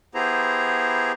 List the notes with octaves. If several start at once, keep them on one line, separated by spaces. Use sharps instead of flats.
B3 E4 G4 G#4 C5 A#5